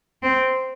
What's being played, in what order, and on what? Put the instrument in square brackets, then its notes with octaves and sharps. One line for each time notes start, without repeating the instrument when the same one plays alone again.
[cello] C4